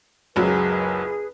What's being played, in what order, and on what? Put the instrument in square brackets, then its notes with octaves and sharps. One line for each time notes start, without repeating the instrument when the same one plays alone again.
[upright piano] F#1 C#2 F#3 [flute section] G#4 B4